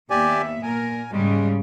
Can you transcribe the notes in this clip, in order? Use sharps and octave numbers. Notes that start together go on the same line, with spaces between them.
D#2 B3 G4 D5 E5 G#5
A#2 A#4 G#5
G#2 C#3 G3 G#3